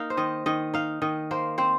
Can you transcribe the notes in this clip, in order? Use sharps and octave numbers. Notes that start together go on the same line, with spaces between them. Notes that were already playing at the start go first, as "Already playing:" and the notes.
Already playing: A#3 D#4 F5
C5
D#3 D#5
D#3 D#5
D#4 F5
D#3 D#5
A#3 C5
C4 C5